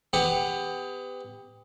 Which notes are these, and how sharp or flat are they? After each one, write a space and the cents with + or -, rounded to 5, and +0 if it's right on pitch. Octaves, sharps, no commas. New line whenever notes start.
B3 +30 G4 +25 F#5 +0